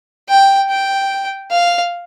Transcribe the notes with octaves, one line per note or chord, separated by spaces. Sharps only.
G5
G5
F5